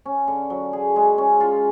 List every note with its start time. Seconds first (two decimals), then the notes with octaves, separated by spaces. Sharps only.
0.06 C#4
0.28 D3
0.50 F#3
0.73 G#4
0.96 G#3
1.18 C#4
1.41 F4